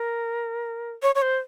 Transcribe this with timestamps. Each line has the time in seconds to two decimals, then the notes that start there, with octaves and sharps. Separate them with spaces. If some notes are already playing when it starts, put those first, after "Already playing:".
Already playing: A#4
1.03 C#5
1.15 C#5
1.22 C5